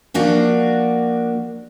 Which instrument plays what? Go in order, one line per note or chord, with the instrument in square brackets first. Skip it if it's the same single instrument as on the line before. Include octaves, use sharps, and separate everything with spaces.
[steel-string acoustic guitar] F3 A#3 D4 F#4